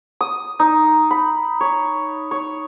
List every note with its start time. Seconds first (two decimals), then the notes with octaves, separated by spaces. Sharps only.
0.21 D#6
0.60 D#4
1.11 B5
1.61 C#5
2.31 C#5